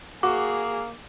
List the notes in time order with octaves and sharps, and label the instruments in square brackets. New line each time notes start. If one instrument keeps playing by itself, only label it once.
[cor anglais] A#3 [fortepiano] F#4 [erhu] G#4 [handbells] D6